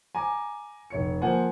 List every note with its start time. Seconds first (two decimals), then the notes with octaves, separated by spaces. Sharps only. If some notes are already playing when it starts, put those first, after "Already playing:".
0.15 G#5 A#5 D6
0.90 F1 C#5 C#7
1.22 F3 A#3 C5 F#5 G#5